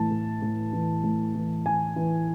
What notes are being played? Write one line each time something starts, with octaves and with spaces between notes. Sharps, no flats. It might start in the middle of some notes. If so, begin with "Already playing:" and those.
Already playing: A2 E3 A5
A2
A2
E3
A2
E3
E3 G#5
E3